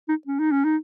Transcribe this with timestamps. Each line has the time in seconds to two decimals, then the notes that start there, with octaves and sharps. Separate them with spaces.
0.09 D#4
0.27 C#4
0.39 D#4
0.52 C#4
0.65 D#4